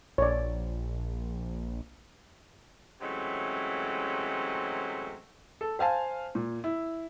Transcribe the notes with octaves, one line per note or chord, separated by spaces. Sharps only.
A#1 C#5 D5
C3 E3 F#3 G#3 A3 C#4
A4
C5 F5 G#5 A5
A#2
E4